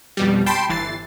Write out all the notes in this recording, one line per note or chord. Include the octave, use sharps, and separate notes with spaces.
F2 B2 G3
G5 A5 B5 C6
G1 E3 A6 C7